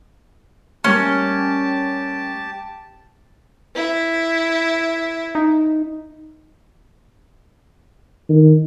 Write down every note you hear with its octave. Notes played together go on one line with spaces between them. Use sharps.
G3 A3 A#3 C#4 G4 A5
E4
D#4
D#3